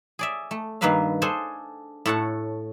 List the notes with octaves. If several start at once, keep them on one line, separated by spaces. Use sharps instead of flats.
G#4 D5 E5
A3
G2 D#3 A#3 B4 E5 F5
D4 G#4 A4 C5 G#5
A2 A4 C#5 F#5 A5